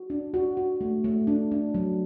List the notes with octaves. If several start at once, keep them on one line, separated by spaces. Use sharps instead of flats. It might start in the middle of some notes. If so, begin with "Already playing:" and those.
Already playing: F#4
D4
F#4
F#4
A3
A3
D4
D4
F#3